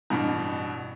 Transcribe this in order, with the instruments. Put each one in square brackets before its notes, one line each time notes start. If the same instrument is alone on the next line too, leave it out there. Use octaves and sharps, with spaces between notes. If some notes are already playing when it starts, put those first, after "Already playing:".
[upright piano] A1 G2 B2